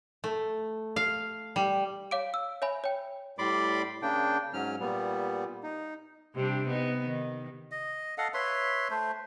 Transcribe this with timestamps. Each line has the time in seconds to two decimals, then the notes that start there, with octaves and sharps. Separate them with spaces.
0.24 A3
0.96 F5
1.56 G3
2.11 C#5 F5 D6 D7
2.34 E6
2.62 C#5 E5 G#5 B5
2.84 C#5 G5
3.38 A2 G3 D5 B5 C6 D6
4.02 C#3 A#3 D4 G5
4.54 G#2 F#3 C#4 F6
4.80 A#2 G3 B3
5.63 D#4
6.35 C3 G3 D4
6.67 B3 D#4
7.04 D#3
7.71 D#5
8.18 A4 D#5 F5 F#5
8.34 B4 C#5 E5 C6
8.90 A3 C5